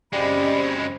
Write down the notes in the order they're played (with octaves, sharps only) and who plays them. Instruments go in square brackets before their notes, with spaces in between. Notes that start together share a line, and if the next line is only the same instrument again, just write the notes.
[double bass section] F#1 C4 C#4 [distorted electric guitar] F#2 G#3 [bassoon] G3 [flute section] D#5 B5